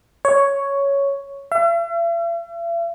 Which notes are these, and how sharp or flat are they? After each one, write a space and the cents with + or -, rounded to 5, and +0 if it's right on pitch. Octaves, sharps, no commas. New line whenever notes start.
C#5 +5
E5 +45